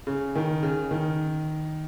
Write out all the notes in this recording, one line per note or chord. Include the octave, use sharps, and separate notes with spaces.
C#3
D#3
C#3
D#3